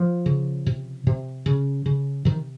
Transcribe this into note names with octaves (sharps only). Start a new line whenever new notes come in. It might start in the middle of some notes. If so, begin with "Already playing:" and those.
Already playing: F3
C#3
C3
C3
C#3
C#3
C3 D#3